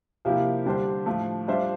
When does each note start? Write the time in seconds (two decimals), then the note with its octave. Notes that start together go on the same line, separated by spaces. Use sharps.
0.25 C3 F3 A#3 E4 G4
0.65 D3 G3 D4 G4 C5
1.06 A2 F3 A3
1.48 G3 D4 F4 C5 E5